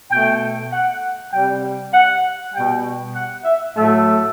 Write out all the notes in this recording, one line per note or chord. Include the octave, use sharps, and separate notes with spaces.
B2 A3 G5
F#5
C3 G3 G5
F#5
B2 G3 G5
F#5
E5
A2 F#3 A3 E5